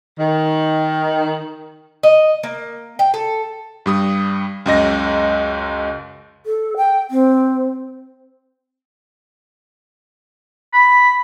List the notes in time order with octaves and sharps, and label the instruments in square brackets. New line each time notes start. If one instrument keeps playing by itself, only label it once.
[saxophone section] D#3
[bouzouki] D#5
A#3
G5
A4
[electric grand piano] G2 G3 D#6
C#2 F#2 D#5 A#6
[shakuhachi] A4
G5
C4
[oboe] B5